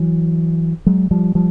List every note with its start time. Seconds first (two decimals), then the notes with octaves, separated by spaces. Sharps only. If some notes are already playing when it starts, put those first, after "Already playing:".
Already playing: E3 F#3
0.86 F#3 G#3
1.11 F3 G3
1.35 F3 G3